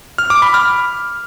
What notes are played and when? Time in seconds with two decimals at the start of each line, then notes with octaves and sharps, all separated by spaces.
0.18 F6
0.30 D6
0.42 B5
0.54 F6